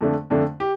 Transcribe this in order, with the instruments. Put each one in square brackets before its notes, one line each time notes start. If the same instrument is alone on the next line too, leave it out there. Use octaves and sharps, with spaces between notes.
[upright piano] F2 D3 A3 D4
F2 D3 A3 D4
G4